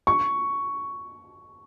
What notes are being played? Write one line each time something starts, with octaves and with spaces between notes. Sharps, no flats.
C#6